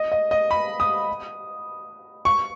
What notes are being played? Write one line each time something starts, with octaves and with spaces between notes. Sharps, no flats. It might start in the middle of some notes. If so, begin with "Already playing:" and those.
Already playing: D#5
D#5
D#5
B5
D#6
C#6